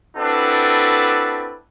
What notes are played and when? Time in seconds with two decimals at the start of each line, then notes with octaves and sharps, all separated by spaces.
0.17 C4 D4 E4 F#4 A4 B4